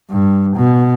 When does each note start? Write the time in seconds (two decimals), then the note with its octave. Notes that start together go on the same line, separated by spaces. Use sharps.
0.11 G2
0.56 B2